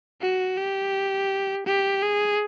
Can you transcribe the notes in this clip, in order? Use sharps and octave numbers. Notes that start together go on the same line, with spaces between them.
F#4
G4
G4
G#4